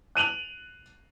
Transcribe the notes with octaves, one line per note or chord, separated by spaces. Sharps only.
F#6 D#7 F7 F#7